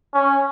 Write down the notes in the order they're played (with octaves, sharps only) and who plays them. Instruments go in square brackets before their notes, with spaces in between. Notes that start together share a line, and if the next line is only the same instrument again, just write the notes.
[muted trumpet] C#4